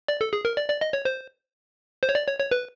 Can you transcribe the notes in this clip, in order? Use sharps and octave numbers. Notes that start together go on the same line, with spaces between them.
D5
A4
G#4
A#4
D5
D5
D#5
C#5
C5
C5
C#5
D5
C#5
C#5
B4